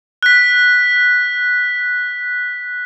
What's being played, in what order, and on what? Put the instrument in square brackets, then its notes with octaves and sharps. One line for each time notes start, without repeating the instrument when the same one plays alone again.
[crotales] F#6 B6